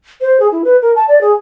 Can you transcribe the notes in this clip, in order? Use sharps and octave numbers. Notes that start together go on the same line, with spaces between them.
C5
G#4
E4
B4
A#4
A5
D5
G#4